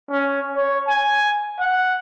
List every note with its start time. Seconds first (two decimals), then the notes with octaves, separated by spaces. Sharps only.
0.10 C#4
0.56 C#5
0.87 G#5
1.59 F#5